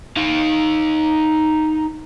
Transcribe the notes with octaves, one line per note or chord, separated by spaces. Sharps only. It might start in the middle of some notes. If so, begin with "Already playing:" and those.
D#4 F5